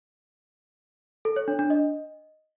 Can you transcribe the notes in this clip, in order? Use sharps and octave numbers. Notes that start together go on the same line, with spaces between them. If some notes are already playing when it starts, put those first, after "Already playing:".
A4
C#5
D4
D4
D#5